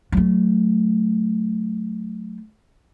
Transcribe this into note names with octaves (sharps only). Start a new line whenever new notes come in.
F#3 A3